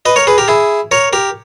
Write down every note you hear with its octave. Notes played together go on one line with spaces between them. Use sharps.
B4 D#5
A#4 C#5
G#4 B4
G4 A#4
E4 G#4
A#4 C#5
G4 A#4